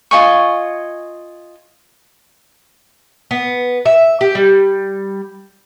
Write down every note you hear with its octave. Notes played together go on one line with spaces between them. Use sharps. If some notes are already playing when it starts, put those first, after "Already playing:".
F4 D#5 G#5 C#6
B3
E5
G4
G3